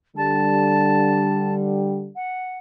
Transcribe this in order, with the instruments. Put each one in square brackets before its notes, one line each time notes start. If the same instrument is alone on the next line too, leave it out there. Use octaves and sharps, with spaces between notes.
[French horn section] D3 G3 [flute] A5
[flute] F#5